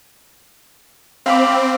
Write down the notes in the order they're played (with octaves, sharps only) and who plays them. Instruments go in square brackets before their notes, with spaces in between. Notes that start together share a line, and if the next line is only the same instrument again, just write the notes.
[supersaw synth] C4 [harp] F5 B5 D6